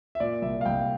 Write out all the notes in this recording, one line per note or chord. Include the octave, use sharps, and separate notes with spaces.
E5
A#2 D5
C2 E5
F5
C2 G5